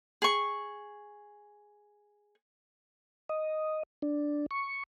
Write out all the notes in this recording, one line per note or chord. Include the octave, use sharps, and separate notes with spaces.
G#4 C#6
D#5
D4
C#6